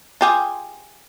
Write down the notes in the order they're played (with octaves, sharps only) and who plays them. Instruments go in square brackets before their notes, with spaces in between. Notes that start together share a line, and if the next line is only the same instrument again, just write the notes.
[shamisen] F4 G4 G#4